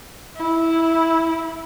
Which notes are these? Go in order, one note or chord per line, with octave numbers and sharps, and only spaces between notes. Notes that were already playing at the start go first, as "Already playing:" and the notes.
E4